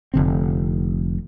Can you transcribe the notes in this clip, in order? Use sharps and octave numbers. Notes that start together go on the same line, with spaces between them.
F1 D3 C4